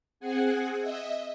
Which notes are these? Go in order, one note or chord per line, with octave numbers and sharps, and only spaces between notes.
C4 G#4 F#5 G#5
D#5 E5